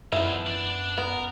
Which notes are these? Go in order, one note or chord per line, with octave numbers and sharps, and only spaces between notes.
F#2 F3 B3 E4 G#4
D4 D5
B3 A#4